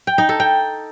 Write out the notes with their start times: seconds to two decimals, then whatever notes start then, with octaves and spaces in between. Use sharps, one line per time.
0.07 G5
0.18 D#4
0.29 A4
0.40 G5